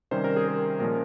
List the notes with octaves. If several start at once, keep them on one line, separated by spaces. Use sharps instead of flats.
C3 D#3 G3 C#4 C5
A#4
G#4
A#4
A#2 F3 G#3 C#4 A#4